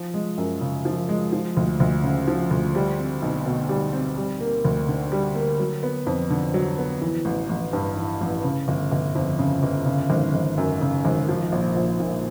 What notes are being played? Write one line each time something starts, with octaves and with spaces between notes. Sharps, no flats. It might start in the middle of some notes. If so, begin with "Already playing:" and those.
Already playing: F3
G#3
F#2
C#3
F3
G#3
F3
D2
D2
C#3
F3
D2
G3
C4
B1
B2
G3
C4
G3
A#3
D2
D3
G3
A#3
F#3
B3
F2
D3
F#3
B3
E3
A1
A1
G2
E3
A1
C#3
G1
G1
F2
C#3
G1
C#3
G#1
G#1
F#2
C#3
G#1
F3
A#1
A#1
A#2